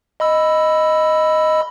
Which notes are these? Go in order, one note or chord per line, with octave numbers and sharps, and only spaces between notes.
D#5 B5 E6